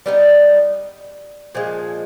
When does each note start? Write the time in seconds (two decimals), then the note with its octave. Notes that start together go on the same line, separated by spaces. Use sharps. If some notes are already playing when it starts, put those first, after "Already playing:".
0.06 G3 B3 D#4
1.55 A#2 F3 G#3